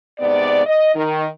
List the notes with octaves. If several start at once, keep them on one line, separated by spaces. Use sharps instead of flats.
G#2 C3 B3 D5
D#5
D#3